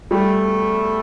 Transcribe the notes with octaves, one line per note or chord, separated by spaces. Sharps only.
E2 B2 G3 A3